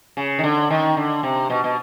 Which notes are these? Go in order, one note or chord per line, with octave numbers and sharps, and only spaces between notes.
C#3
D#3
D3
D#3
D3
C3
B2
B2